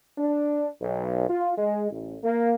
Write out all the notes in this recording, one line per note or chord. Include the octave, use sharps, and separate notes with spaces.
D4
B1
F4
G#3
A1
A#3